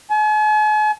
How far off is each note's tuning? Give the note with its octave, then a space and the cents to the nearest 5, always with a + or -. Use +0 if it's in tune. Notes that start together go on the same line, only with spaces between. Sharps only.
G#5 +45